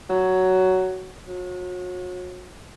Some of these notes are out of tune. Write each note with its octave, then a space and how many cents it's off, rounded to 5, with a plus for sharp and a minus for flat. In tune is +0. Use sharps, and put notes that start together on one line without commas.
F#3 +10
F#3 -35